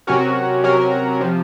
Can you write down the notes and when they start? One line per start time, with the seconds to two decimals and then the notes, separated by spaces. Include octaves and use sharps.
0.07 C3 F#3 C#4 F#4 A#4
0.64 C3 F#3 C#4 F#4 A#4
1.21 C3 F3